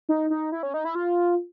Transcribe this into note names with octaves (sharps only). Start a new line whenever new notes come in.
D#4
D#4
E4
C#4
D#4
E4
F4